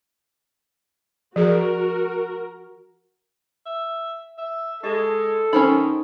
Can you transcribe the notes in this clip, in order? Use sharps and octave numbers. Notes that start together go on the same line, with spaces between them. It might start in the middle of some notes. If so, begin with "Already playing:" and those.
F3 F#4 G#4 A#4
E5
E5
G#3 G4 A4 D#5
D#3 C#4 D#4 C5 B5